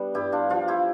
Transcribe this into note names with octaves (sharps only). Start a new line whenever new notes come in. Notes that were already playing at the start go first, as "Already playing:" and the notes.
Already playing: G3 B3 D4
G2 E4 G4
D4 F4
F3 D4 F4
E4 G4